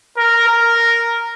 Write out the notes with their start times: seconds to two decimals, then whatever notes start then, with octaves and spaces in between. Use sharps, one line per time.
0.17 A#4
0.48 A#4